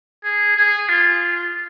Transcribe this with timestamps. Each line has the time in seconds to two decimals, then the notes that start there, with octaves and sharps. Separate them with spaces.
0.24 G#4
0.56 G#4
0.89 F4